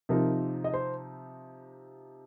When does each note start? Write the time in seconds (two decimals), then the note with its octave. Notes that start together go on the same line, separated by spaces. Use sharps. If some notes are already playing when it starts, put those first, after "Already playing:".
0.09 C3 F3 D#4 A#4
0.64 D#5
0.74 C5